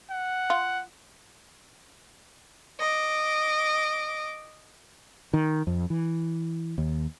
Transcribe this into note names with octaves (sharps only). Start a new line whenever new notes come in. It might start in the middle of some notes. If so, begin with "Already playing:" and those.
F#5
F4
D#5 D6
D#3
F2
E3
D#2